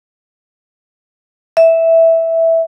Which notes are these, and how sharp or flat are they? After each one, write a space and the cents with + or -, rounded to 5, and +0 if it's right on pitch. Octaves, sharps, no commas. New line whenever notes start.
E5 -5